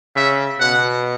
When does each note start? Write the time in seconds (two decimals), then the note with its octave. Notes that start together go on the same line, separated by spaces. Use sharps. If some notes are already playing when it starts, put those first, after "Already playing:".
0.16 C#3 E5
0.59 B2 F#5